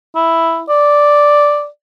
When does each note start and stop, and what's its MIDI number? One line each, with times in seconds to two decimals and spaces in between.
0.15 0.62 64
0.69 1.67 74